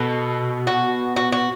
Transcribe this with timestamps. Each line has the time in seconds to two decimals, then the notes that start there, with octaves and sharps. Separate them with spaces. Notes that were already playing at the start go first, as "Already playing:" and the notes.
Already playing: B2 A4
0.67 F#4
1.16 F#4
1.32 F#4